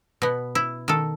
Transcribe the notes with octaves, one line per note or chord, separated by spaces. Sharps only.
B2 B3
E4
D#3 A4